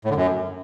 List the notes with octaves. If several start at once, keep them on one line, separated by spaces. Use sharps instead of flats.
A2
D3
F#2